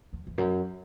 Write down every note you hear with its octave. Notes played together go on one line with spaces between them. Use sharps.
E2
E2
F#2